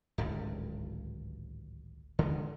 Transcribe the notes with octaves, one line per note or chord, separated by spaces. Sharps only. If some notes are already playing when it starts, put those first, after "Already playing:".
D1 G#1 C#2 G2
D3 D#3 G#3